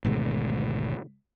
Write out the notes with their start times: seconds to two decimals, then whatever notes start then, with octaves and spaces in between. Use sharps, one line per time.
0.05 G#1 D2 B2 G#3